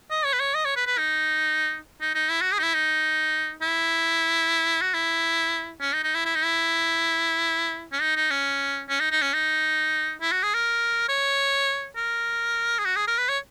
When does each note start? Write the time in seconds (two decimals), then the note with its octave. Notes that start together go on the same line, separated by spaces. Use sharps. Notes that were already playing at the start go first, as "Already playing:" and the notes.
0.10 D#5
0.25 C#5
0.33 B4
0.40 C#5
0.54 D#5
0.65 C#5
0.76 B4
0.87 B4
0.98 D#4
2.01 D#4
2.15 D#4
2.29 E4
2.41 F#4
2.52 G#4
2.59 D#4
2.63 E4
2.74 D#4
3.62 E4
4.81 F#4
4.94 E4
5.81 C#4
5.93 D#4
6.03 D#4
6.14 E4
6.25 E4
6.35 D#4
6.44 E4
7.92 C#4
8.01 D#4
8.16 D#4
8.30 C#4
8.89 C#4
9.00 D#4
9.11 D#4
9.22 C#4
9.33 D#4
10.21 E4
10.32 F#4
10.43 G#4
10.54 A#4
11.09 C#5
11.96 A#4
12.79 G#4
12.85 F#4
12.96 G#4
13.07 A#4
13.18 B4
13.29 C#5